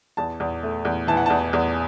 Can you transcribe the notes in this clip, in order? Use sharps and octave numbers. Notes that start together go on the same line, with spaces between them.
E2 A5
E2
A3
E2
E3 A5
F#5
E2 A5
E2